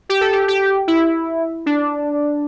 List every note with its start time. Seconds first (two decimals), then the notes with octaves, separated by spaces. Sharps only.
0.09 G4
0.21 A4
0.33 G4
0.48 G4
0.88 E4
1.66 D4